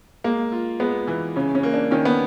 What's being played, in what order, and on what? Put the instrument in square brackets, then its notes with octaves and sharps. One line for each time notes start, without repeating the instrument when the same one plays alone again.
[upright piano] G#3 [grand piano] A#3
[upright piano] F4
[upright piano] G#3 [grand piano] B3
[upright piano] E3
[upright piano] C#3 [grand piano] C#4
[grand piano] C#4
[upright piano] A#3
[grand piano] D4
[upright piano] D#3 [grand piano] C#4
[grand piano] B3